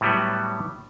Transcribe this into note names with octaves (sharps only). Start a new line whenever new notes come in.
A2 F#3 G3 B3